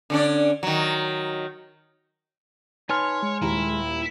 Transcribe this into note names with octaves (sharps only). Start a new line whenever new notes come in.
D3 C#4 D4
D#3 F#3
D#4 B4 C#5 G#5 A5 C6 F6
G#3
D#1 D#2 E4 A#5